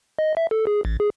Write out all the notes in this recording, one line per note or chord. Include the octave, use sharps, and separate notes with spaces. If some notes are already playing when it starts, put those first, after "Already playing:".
D#5
E5
A4
G#4
A1
G#4